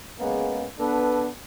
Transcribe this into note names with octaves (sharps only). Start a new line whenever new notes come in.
C#3 G#3 A#3 B3
B3 D4 A4 B4